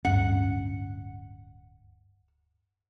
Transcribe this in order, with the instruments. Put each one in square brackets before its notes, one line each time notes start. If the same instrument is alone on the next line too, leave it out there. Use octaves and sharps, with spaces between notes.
[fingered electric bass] D1 G2 C#4 [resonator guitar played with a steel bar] F#5